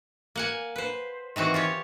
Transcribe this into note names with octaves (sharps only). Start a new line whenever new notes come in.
A#3 F#5 G#5
B4 C5
D#3 E3 C4 F#4
F4 G4 C#5